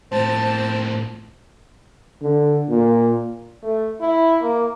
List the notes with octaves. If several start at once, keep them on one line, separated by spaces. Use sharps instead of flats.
A2 F3 C4 C5 A5
D3
A#2
A3
E4
A#3